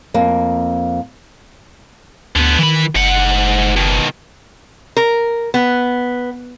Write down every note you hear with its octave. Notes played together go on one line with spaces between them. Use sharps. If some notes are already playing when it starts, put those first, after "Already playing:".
F2 A#3
D2 D3 B3
D#3 E3 B5
F#1 G#2 F#5
B2 D#3
A#4
B3